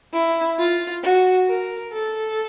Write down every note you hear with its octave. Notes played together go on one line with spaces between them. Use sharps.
E4
F4
F#4
A#4
A4